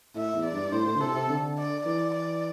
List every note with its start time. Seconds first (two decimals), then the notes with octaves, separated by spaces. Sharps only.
0.15 A2 E5
0.34 E2
0.45 D5
0.53 G2
0.72 A2 C5
0.87 A2
0.95 D3
1.01 C3 A4
1.15 C3
1.29 D3
1.58 D5
1.86 E3 D5
2.14 D5